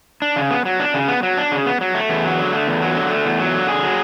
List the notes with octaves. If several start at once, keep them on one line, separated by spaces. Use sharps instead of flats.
D4
C#3
B3
F#3
D4
C#3
B3
F#3
D4
C#3
B3
F#3
A3
E2
F#3
D3
A3
E2
F#3
D3
A3
E2
F#3
D3
G#4
F#3